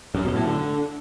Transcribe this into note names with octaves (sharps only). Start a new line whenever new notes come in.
F#2
B2
A2
D3